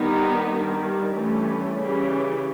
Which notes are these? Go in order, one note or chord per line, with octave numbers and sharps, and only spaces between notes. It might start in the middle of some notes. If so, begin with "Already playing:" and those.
Already playing: D#3 G3 B3 D#4
G2 D#3 G3
G2 E3 A3 C#4
C#3 E3 G3